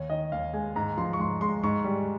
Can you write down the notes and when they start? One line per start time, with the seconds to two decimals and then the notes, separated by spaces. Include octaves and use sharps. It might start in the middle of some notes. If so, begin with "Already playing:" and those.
Already playing: D#2 C#5
0.10 D#3 D#5
0.32 D#2 F5
0.53 G#3 G#5
0.76 G#2 A#5
0.98 F3 C6
1.13 C#6
1.19 G#2 C6
1.41 G#3 C6
1.63 G#2 C#6
1.84 G3